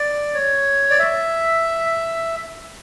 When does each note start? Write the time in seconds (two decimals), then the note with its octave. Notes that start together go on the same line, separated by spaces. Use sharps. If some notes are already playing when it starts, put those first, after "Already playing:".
Already playing: D5
0.34 C#5
0.90 D5
0.99 E5